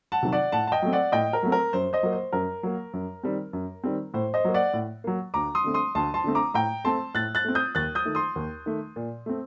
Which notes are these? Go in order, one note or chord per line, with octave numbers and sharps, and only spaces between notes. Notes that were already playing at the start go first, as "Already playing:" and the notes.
F#5 A5
C3 D#3 F#3
D5 F#5
A2 F#5 A5
A5
D#5 G5
F#3 A3 C4
D5 F#5
A2 D#5 G5
A#4
F#3 A3 C4
A#4
F#2 C5
C5 D#5
F#3 A#3
C5
F#2 A#4
F#3 A#3
F#2
D#3 G3 C4
F#2
D#3 G3 C4
A2 C5
C5 D#5
F#3 A#3
D5 F#5
A2
F#3 A#3
D2 A#5 D6
C6 D#6
D3 A3 C4
C6 D#6
D2 A5 C6
A5 C6
D3 A3 C4
A#5 D6
A2 G5 A#5
A3 C4 A5 C6
A2 F#6 A6
F#6 A6
A3 C4
D#6 G6
D#2 F#6 A6
D#6 G6
D#3 A3
C6 D#6
D#2
D#3 A3
A#2
A3 C4